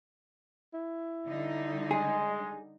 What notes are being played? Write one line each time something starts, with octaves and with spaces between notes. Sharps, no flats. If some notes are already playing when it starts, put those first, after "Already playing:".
E4
D3 G3 D#4
G#3 G#4